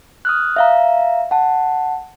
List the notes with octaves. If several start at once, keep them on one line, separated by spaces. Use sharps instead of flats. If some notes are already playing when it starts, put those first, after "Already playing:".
D#6 F6 F#6
E5 F5 A#5
F#5 A5